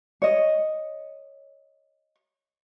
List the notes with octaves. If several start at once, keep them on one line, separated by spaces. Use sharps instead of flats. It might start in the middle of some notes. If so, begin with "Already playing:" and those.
C#5 D#5